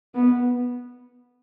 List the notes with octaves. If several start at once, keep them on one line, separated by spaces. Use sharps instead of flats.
B3